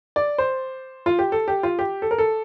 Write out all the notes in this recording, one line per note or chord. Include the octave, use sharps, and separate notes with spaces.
D5
C5
F4
G4
A4
G4
F4
G4
A4
A#4
A4